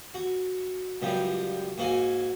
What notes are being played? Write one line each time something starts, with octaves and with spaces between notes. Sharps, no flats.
F#4
C#2 F#2 F3 G3
G#2 A#3 F#4 G#5